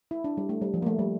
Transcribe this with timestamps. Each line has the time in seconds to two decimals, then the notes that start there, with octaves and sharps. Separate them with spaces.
0.11 E4
0.24 D4
0.37 G3
0.49 A3
0.62 G3
0.74 F3
0.82 A#3
0.86 A3
0.99 G3